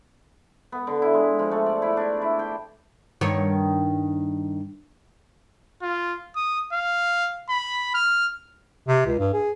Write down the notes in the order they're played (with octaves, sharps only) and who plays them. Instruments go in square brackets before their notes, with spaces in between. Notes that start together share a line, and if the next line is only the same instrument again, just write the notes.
[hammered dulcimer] B3
D3
E4
G#3
F3
A3
D5
E4
D4
E4
G5
[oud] G2 D#3 C#5
[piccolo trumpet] F4
D#6
F5
B5
F6
[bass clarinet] C3
C#2
G2
G#4